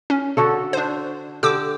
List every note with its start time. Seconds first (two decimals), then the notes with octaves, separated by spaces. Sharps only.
0.10 C#4
0.37 D3 F#4 A4
0.73 D4 C5
1.43 D3 G4 D6 E6